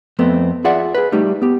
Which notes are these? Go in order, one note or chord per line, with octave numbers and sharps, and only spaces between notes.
F2 A3 B3 C4
F4 G#4 D5 E5 F#5
G#4 B4
G3 A3 D#4 G4
B3 G4